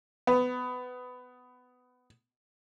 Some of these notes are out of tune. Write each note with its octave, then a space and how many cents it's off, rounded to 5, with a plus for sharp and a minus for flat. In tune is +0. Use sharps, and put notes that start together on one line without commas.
B3 +20